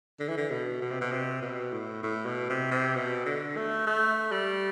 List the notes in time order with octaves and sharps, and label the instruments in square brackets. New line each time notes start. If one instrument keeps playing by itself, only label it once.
[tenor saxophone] D3
E3
D3
B2
B2
C3
B2
C3
B2
A2
A2
B2
C3
C3
B2
D3
A3
A3
G3